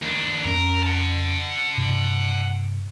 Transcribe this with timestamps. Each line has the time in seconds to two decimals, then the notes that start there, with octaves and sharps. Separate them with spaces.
0.02 D#2 D4
0.45 F2 C#4 A#4
0.83 F#5 A5
1.77 G2 C3